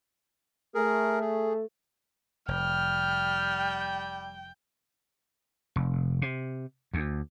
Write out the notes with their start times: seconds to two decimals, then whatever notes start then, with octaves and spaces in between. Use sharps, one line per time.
0.75 A3 G#4 A#4
1.21 G#4
2.48 F1 G3 G5 F6
5.76 F1
6.22 C3
6.94 D2